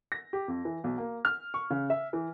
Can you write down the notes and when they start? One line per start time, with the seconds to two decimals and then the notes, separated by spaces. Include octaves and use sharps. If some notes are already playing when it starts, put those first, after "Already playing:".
0.12 A#6
0.33 G4
0.48 F2
0.65 E3
0.84 B1
0.98 A#3
1.25 F6
1.54 C#6
1.70 C#3
1.90 E5
2.13 E3